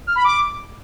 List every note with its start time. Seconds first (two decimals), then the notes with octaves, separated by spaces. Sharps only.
0.07 F6
0.16 B5
0.24 D6